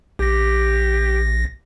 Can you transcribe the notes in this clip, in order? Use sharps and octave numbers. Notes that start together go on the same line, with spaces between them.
A#1 G4 A#6